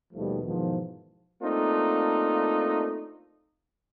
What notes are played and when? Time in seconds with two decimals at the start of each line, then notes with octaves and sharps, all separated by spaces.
0.13 D#2 B2 D#3 F3 G3 A3
0.44 E2 G#2 B2 D#3 F3
1.42 A3 A#3 C4 D4 D#4 F4